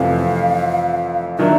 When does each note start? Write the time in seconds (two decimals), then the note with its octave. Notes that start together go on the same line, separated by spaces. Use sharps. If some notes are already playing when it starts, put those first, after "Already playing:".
Already playing: F2 C3 E3 A3 F5
1.39 D#3 F#3 A#3 D4 E5